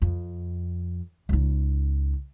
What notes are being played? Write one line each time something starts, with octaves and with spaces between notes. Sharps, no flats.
F2
C#2 D#4